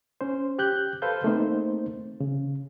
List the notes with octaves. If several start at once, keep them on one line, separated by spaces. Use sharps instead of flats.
C#4 C5
G4 F#6 G6
A4 B4 C5 F5 G6
A3 A#3 C4 D#4 C5
C#3